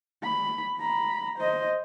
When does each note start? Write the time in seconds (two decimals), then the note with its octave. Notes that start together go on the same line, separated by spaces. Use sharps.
0.24 B5
0.78 A#5 B5
1.38 C5 D#5